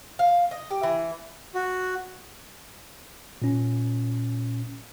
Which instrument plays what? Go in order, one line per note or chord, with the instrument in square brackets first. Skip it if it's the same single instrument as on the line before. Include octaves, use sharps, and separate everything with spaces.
[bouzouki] F5
D#5
G4
E3
[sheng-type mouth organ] F#4
[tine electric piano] A#2 C#4